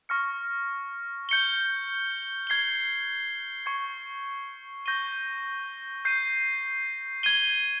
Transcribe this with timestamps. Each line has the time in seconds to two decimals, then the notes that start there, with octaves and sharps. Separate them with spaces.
0.09 C#6 F6 A#6 C#7
1.29 G6 C#7 G7
2.47 G#6 C7 G7
3.66 C#6 G#6 C#7
4.86 C#6 G6 A#6 D#7 G7
6.05 G6 C7 D#7
7.23 G#6 D#7 G7